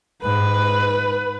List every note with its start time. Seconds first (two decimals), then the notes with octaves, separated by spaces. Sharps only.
0.22 G#2 B4